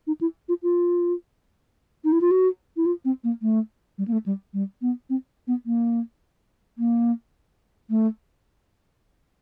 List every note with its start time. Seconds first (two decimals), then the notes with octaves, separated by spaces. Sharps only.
0.07 D#4
0.21 E4
0.49 F4
0.63 F4
2.04 D#4
2.12 E4
2.21 F4
2.31 F#4
2.77 E4
2.86 F4
3.05 C4
3.24 A#3
3.42 A3
3.98 G3
4.08 A#3
4.12 A3
4.26 G3
4.54 G3
4.82 B3
5.10 C4
5.47 B3
5.66 A#3
6.78 A#3
7.90 A3